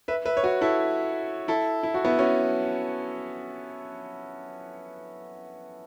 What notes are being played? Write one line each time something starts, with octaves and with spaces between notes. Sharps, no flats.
B4 E5
B4 E5
C#5
F#4 B4
E4 A4
E4 A4
E4
F#4
B3 E4
C#4 F#4